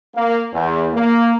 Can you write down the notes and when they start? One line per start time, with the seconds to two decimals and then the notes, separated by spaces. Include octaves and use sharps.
0.16 A#3
0.53 E2
0.94 A#3